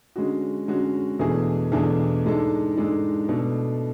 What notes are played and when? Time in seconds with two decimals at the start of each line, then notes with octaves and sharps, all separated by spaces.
0.16 D3 G#3 C#4 F#4
0.68 D3 G#3 C#4 F#4
1.19 E2 B2 A3 D4 G#4
1.72 E2 B2 A3 D4 G#4
2.24 G#2 G#3 D4 A4
2.77 G#2 G#3 D4 A4
3.28 B2 A3 D4 A4